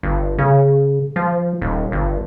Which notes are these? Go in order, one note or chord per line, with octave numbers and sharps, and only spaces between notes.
G1
C#3
F3
D#1
G1